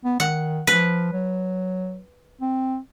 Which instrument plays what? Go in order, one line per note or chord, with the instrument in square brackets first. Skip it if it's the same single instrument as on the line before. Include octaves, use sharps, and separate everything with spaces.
[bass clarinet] B3
[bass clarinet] D#3 [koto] F#5
[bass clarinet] F3 [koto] B4
[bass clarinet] F#3
C4